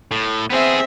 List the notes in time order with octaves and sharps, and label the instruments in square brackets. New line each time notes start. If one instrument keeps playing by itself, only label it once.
[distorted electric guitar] A2
[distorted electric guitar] B3 G#4 [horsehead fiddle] C4 E5